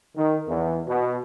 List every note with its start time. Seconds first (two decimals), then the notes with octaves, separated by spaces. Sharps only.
0.16 D#3
0.48 E2
0.87 B2